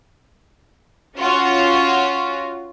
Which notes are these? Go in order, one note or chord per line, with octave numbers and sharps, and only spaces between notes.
C#4 F4 F#4